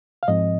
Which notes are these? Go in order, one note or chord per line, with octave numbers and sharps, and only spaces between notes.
F5
G#2 F3 C4 D#5